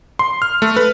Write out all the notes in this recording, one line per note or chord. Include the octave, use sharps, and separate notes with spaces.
C6
F6
A3
B4